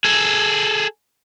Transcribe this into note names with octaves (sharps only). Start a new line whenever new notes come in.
G#4 A4